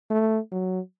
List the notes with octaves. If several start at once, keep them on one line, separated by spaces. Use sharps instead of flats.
A3
F#3